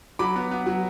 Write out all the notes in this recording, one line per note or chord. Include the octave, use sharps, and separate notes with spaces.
F#3 B5 D6
B3
B3
F#3